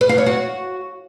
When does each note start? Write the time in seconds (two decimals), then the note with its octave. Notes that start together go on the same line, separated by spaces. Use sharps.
0.01 B4
0.09 F5
0.18 C#5
0.26 F#4